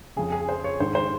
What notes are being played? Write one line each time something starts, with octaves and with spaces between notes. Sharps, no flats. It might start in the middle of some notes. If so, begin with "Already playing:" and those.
F2 C#3 G#4
G#4
C5
C#5
G#2 D#3 C5
C5